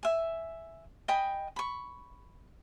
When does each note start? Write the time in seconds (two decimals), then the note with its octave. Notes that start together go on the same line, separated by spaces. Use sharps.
0.03 E5 G#5
1.08 D#5 G5 G#5 B5
1.56 B5 C#6